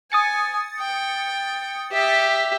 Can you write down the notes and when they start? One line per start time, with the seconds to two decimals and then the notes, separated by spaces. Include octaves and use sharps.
0.12 G#5 D#6 A6 C#7
0.80 G5
1.92 G4 E5